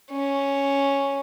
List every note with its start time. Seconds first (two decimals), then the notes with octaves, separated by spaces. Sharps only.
0.11 C#4